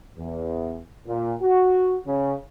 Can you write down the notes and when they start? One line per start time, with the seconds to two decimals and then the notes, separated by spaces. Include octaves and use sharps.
0.18 E2
1.07 A#2
1.42 F#4
2.07 C#3